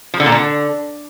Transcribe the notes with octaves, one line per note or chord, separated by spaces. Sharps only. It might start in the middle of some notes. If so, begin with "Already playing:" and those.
F3
D3
A#2
D3